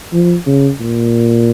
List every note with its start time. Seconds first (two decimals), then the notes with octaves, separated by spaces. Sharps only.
0.13 F3
0.46 C#3
0.80 A#2